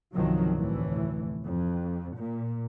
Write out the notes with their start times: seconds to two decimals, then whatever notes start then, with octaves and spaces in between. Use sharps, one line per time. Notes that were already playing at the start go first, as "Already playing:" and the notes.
0.13 G1 C2 C3 D#3 F3 F#3
0.55 F1 D2 A2 E3
1.44 F2
2.17 A#2